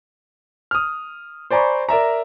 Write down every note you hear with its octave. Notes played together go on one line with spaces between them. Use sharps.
D#6 F6
C5 D5 G#5 A#5 B5 C#6
A#4 D5 E5 A#5